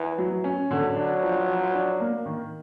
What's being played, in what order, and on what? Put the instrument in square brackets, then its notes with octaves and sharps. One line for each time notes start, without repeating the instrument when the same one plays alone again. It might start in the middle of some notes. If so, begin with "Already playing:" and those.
Already playing: [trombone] E3
[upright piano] F#3
C#4
[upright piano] D3 [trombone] F#3
[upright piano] D4
F3
F3
D4
A#3
D#3